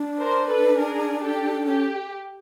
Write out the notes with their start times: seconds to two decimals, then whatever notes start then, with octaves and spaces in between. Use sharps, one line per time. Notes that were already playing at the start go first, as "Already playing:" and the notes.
Already playing: D4
0.19 A#4 C5
0.48 A4 B4
0.77 G#4 A#4
1.22 G4 A4
1.66 C#4 G4